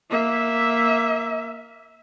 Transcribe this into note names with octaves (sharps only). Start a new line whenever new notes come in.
A#3 E5